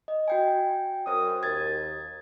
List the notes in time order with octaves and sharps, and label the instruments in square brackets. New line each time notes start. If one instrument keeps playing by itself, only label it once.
[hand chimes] D#5
F#4 G5 G#5
[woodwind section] F#2 C5 D#6
[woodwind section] D#2 [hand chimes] G#6 A6